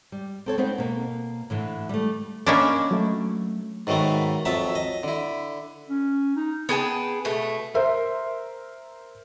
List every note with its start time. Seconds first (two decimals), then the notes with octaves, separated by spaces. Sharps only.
0.12 G3
0.46 C4 A4 C#5
0.58 B3 C4 D#4 C5
0.78 B2 A#3
1.50 A2 D3 E3
1.89 G3 A3
2.47 A#3 C#4 D4 D#5 B5 D6
2.91 F#3 A3
3.87 G#2 D#3 F#3 A3 B3
4.45 F2 F#3 E5 A5 D#6
4.75 D#5
5.03 D3 E4
5.89 C#4
6.36 D#4
6.69 B3 G#4 G5 A5
7.25 B2 A3
7.74 A#4 C5 E5